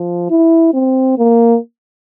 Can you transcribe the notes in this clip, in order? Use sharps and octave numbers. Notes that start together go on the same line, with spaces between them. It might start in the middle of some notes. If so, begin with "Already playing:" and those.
Already playing: F3
E4
C4
A#3